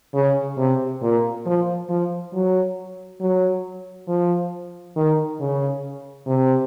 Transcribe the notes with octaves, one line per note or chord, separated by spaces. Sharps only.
C#3
C3
A#2
F3
F3
F#3
F#3
F3
D#3
C#3
C3